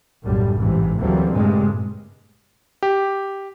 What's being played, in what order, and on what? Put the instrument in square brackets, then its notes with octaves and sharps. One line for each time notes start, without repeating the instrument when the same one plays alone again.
[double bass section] B1 F#2 A2 D3 G3
A1 G#2 C3 E3
D2 E3 F#3 G3 A#3 C4
G2 A#2 C#3 G#3 A3
[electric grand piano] G4